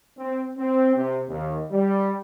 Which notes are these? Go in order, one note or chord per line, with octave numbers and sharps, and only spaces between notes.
C4
C4
C3
D#2
G3